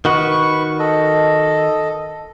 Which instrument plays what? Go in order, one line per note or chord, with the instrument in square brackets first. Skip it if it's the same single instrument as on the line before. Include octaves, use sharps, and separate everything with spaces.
[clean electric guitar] D#3 F#4 [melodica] B4 C#6
[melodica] A4 D#5